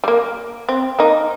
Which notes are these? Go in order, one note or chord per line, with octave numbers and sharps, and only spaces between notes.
G3
A#3
C4
A#3 D#4